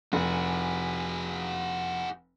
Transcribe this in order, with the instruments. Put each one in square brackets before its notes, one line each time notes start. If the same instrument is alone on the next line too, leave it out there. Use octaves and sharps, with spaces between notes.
[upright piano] F1 [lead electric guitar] F#4 G#4